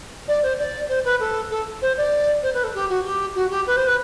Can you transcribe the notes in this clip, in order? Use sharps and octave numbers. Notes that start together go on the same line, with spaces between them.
D5
C5
D5
C5
B4
A4
A4
C5
D5
C5
B4
A4
G4
F#4
G4
F#4
G4
B4
C5
B4